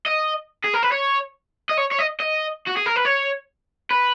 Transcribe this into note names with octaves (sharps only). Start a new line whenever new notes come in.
D#5
G#4
A#4
B4
C#5
D#5
C#5
C#5
D#5
D#5
F#4
G#4
A#4
B4
C#5
B4